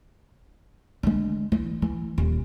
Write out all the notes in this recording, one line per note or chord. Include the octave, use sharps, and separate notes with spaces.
D3 G#3
E3
E3
D#1